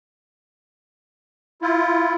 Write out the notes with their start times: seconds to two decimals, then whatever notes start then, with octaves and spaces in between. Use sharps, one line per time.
1.62 E4 F4